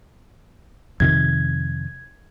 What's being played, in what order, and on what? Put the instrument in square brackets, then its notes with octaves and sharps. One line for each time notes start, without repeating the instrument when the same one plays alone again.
[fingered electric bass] F2 C3 D#3 [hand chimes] G#6